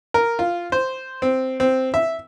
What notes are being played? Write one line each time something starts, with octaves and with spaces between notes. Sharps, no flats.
A#4
F4
C5
C4
C4
E5